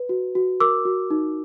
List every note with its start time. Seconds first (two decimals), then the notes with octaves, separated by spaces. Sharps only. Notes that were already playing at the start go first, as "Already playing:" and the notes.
Already playing: B4
0.09 F#4
0.35 F#4
0.60 A#4 D6 E6
0.85 F#4
1.10 D#4